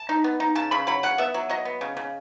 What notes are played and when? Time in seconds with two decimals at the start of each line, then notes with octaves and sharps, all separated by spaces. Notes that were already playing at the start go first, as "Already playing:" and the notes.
Already playing: A5
0.09 D#4
0.24 B3
0.40 D#4
0.55 C#3 A5
0.71 C#3 B5
0.87 F#3 B5
1.03 C#3 F#5
1.18 B3 E5
1.34 F#3
1.49 F#3 D#5
1.65 B3
1.81 C#3
1.97 C#3